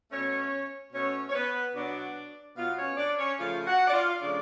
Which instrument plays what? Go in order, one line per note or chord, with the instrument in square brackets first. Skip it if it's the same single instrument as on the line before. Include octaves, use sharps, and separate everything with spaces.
[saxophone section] B2 A3 C#4 C#5
B2 A3 C#4 C#5
C#5
B3 B4
B2 F#3 B3 D4 D5
B2 F#3 B3 F4 F5
C#4 C#5
D4 D5
C#4 C#5
C#3 F3 A3 F4 F5
F#4 F#5
D5
F4 F5
C#3 F3 A3 D4 D5